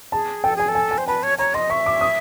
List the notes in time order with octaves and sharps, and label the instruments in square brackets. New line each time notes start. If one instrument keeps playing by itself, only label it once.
[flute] G#4 [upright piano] A5
[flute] A4 [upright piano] G5
[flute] G#4 [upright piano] G#5
[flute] A4
[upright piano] G#5
G#5
[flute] C5
[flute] B4 [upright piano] A5
[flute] C#5
[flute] C#5 [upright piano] A#5
[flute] D#5 [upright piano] C6
[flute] E5 [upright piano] C#6
[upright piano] D6
D#6